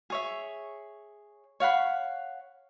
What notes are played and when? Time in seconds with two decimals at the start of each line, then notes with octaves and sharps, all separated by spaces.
0.10 G#4 C#5 E5
1.60 C#5 F5 F#5 B5